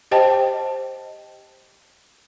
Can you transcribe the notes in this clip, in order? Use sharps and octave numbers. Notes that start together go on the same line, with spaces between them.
G4 C5 D#5 G5 A5